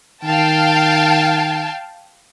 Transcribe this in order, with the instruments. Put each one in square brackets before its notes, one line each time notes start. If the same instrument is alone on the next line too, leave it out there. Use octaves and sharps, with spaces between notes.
[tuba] D#3 [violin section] F5 G5 A5